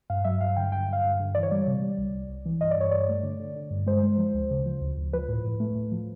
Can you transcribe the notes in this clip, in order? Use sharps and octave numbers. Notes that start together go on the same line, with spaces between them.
G2 F5
F#3 E5
G2 F5
D3 G5
G2 G5
G2 F5
G2
D3
E3 D5
C#5
G3 D5
C3
G3
C2
C2
C2
E3
G2 D#5
D5
G2 C#5
G2 D5
A3
D3
D3
D3
G2
G#3 C5
G#3
F3
D2
C#3
F3
D2
D2
F3 B4
A2
A2
A3
A2
F3